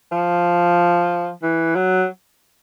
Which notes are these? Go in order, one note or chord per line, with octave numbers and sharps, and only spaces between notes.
F3
E3
F#3